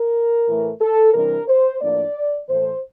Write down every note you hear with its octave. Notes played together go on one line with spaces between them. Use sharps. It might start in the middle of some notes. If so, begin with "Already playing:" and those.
Already playing: A#4
A2 E3 A3
A4
C3 E3 G3 D4 A#4
C5
A2 F3 A#3 D4 D5
A2 E3 A3 C5